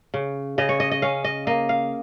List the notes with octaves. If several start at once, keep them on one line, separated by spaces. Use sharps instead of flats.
C#3
C#3 D#5
C#5
D#5
D#5
C#4 F5
D#5
A#3 D#5
F5